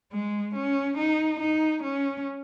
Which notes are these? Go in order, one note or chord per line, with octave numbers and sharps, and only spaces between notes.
G#3
C#4
D#4
D#4
C#4